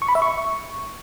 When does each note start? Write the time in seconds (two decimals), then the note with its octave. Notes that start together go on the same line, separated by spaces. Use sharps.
0.02 C#6
0.08 B5
0.15 E5
0.22 C#6